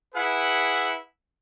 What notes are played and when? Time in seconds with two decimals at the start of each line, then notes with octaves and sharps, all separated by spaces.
0.15 E4 G#4 B4 F#5